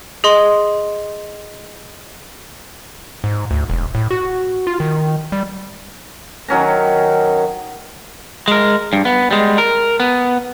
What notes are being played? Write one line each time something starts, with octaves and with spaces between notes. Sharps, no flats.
G#4 D#5 C6
G#2
D2
E1
A2
F#4
F4
D#3
G3
D#3 F#3 C#4 A#5
G#3 A#4
G2
B3
G3 G#3
A#4
B3